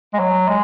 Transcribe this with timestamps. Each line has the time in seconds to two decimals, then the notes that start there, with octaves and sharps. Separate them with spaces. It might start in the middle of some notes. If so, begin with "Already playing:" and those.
0.14 G#3
0.19 F#3
0.48 G#3